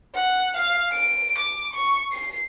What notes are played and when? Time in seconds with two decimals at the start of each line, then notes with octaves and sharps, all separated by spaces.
0.14 F#5
0.56 F5
0.93 D7
1.38 D6
1.73 C#6
2.12 C7